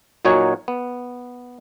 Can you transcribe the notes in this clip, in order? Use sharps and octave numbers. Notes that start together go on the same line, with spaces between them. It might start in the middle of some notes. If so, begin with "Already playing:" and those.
A#2 F#3 D#4 F#4 C#5 G#5
B3